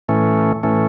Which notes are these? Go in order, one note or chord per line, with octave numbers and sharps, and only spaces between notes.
A2 E3 A3 C#4
A2 E3 A3 C#4